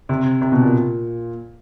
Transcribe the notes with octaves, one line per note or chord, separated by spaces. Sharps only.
C3
C3
B2
A#2